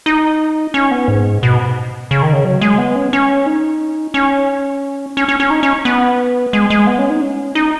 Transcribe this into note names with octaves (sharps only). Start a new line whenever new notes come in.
D#4
C#4
B3
G#2
B2
C#3
D#3
C#3
F#3
G#3
B3
C#4
C#4
D#4
C#4
C#4
C#4
C#4
D#4
C#4
B3
G#3
G#3
B3
C#4
D#4
C#4
D#4